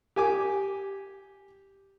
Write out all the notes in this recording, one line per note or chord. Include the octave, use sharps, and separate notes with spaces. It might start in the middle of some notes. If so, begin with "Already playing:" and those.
G4 G#5 D6